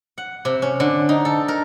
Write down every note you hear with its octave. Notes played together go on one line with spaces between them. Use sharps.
F#5
C3
C#4
D3
D#4
A4
A#4